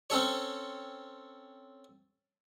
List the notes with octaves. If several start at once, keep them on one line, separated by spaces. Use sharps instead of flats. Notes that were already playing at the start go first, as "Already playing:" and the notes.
C4 C#4 A4 C#5